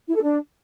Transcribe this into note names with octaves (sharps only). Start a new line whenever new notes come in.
E4
A4
D4